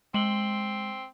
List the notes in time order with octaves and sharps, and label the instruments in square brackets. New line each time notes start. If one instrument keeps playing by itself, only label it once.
[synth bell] G#3 F#7 G7 [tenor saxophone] C4